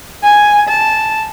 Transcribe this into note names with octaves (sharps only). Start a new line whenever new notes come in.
G#5
A5